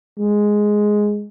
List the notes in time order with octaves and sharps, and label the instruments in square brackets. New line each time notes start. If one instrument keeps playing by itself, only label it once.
[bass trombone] G#3